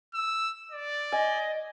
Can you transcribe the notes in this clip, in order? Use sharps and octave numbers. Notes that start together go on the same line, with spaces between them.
E6
D5
D#5 G#5